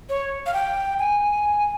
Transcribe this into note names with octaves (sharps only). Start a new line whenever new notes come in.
C#5
F5
G5
G#5